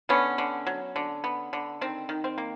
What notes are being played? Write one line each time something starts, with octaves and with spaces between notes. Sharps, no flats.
D3 B3 C#4
D3
F#3
D3
B3
D3
D#3 C4
D#3
C4
A#3